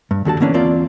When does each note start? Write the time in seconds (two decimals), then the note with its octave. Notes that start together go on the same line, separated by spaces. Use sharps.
0.11 G2
0.25 D#2 D3 F#4 A5
0.40 D3 E3 A#3 B3 C#4 D4
0.54 E2 A#3 C4 F4 D5